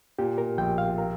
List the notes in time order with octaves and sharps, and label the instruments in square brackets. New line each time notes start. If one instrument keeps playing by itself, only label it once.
[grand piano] A#2 [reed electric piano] G4
[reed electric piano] A#4
[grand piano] A#1 [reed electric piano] G5
[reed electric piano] F5
[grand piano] A#4